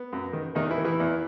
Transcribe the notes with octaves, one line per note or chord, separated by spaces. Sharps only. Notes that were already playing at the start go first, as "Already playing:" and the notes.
Already playing: B3
F#2
D#3
E2 D#3 D#4
E3 E4
D#3
E3 E4
E2